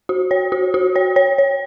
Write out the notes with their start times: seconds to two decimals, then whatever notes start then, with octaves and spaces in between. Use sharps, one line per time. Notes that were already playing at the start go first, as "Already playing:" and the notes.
0.09 F#4
0.31 C#5
0.52 F#4
0.74 F#4
0.96 C#5
1.16 C#5
1.38 C#5